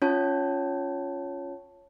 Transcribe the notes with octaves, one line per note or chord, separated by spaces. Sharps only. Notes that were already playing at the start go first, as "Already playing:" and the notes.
C#4 F4 C#5 A5